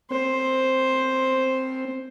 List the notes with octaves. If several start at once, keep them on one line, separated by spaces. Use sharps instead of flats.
C4 C5